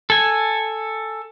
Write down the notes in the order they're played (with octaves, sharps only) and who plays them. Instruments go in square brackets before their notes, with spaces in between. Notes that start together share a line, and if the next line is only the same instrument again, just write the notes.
[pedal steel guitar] A4 G#5